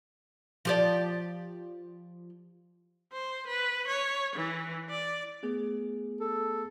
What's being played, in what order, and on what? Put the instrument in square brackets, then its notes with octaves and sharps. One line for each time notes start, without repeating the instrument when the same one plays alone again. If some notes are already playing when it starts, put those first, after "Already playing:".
[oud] F3 G4 D5
[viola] C5
B4
C#5
E3
D5
[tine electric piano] A3 B3 G#4
[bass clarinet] A4